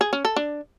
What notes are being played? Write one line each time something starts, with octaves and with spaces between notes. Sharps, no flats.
G#4
C#4
A4
D4